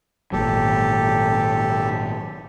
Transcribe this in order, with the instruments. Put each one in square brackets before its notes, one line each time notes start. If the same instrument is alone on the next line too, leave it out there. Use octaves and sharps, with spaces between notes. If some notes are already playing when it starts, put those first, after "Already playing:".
[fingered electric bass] G#1 A#2 F#3 [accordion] G4 A4